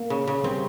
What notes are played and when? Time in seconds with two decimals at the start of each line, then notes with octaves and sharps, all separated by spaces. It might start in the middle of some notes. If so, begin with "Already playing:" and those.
Already playing: A#3
0.10 C#3
0.27 C#3
0.44 G3 C4